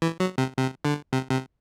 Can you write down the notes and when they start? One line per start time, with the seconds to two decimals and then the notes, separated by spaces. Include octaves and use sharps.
0.02 E3
0.20 F#3
0.38 C3
0.57 C3
0.85 D3
1.13 C3
1.31 C3